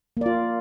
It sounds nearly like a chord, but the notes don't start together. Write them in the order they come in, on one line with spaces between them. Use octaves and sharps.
A#3 D5 F4